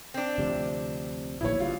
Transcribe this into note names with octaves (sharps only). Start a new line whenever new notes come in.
C4 D4
D2 C3 F3
D1 A#1 D#2 E4 C#5
G1 G2 F4